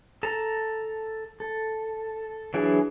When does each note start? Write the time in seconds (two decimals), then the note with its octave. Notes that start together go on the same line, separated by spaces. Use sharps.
0.23 A4 A5 A#5
1.40 A4
2.54 E3 F#3 D4 E4 G#4